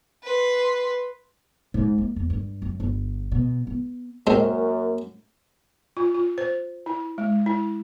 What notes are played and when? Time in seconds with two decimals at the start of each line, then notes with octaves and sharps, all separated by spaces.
0.23 B4 C6
1.74 G#2
1.98 A#3
2.16 E2
2.30 G2
2.62 F#2
2.80 G1
3.32 B2
3.67 B3
4.27 F#2 G#3 A#3 C4 F#4 A#4
5.97 F4
6.14 F4
6.38 C5
6.86 E4
7.18 G#3
7.46 E4